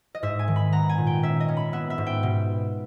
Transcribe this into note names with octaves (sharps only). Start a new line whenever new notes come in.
D#5
G#2 E5
G#5
D#3
B5
B3 A#5
G#5
A#2
G5
C#4 E5
D#5
C#4
B5
B3 E5
E5
G#2
G5
B2